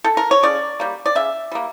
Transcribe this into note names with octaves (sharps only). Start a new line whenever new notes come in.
A4
A#4
C#5
C#3 D5
G3 A#3
D5
C#3 E5
G3 A#3